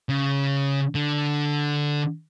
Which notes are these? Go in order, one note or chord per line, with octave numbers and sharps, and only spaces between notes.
C#3
D3